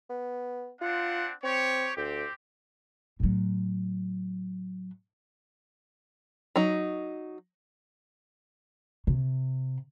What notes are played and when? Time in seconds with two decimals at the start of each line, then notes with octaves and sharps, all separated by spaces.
0.10 B3
0.81 C4 D4 F4 F#5
1.44 C4 G4 C#5
1.97 D2 C4 G4
3.20 A2 F#3
6.56 F#3 D#4
9.07 C3